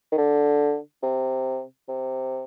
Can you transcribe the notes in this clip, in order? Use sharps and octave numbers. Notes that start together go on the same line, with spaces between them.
D#3
D3
C3
C3